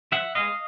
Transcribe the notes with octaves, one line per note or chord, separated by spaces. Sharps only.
F3 E5 F#5
G#3 B3 D#5 F5